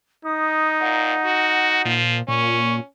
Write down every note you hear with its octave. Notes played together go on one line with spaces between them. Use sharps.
D#4 D#6
A#2 F#5
F#4
A#2 F3
A#2 C#4 C#6